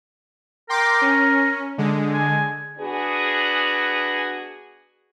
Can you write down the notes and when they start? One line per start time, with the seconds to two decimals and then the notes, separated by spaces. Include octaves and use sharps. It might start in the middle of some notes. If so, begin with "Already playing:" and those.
0.69 A#4 G5 C6 D6
1.02 C#4
1.78 D3 G#3
2.14 G#5
2.79 B3 D4 F#4 G#4